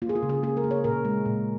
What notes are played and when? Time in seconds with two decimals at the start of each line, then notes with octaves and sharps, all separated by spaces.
0.02 A#3 F4
0.09 G#4
0.15 F4
0.23 C#3
0.29 G#4
0.43 A#3 G#4
0.57 A#4
0.64 A#3
0.71 C#5
0.84 A#2 A#4
1.05 G#3
1.26 A#2